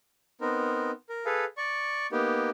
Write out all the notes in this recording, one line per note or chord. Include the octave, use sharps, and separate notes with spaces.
B3 C4 D#4 A#4
A#4
G#4 A4 B4 F5
D5 C#6
A#3 B3 D#4 G4